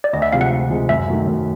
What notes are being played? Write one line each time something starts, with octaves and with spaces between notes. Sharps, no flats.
D5
D2 D#5
E5
C3 F3 G#3 F5
F#5
D2
C3 F3 G#3
F#2 E5
D#3 F#3 A3
F#2